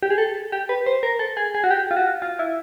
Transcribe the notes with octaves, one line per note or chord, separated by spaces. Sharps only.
G4
G#4
A4
G4
B4
C5
A#4
A4
G#4
G#4
F#4
G4
F4
F#4
F4
E4